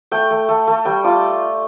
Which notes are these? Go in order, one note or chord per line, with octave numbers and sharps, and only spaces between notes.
A3 G5
A3
A3
A3
G3 G5
F4 D5